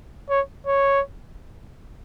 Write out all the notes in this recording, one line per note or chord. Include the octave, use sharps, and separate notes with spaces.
C#5
C#5